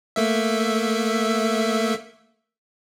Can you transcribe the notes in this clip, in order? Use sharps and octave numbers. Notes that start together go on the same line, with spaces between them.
A3 A#3 E5